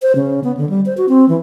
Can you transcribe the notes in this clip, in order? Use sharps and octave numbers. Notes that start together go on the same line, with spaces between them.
C5
C#3
B3
D3
G3
C5
F#4
C4
E3